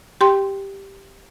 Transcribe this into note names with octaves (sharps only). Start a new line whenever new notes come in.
G4 G5 C6